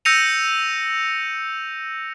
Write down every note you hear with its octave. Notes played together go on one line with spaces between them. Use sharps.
E6 G6 A#6 C#7 D#7 F7